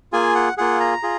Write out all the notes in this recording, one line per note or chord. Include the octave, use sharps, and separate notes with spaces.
A#3 F4 G#4 G#5
F#5
A#3 F4 G#4 F#5
A#5
F4 G#4